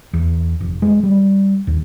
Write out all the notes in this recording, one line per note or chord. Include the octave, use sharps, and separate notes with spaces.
E2
F1
G#3
G3
D#2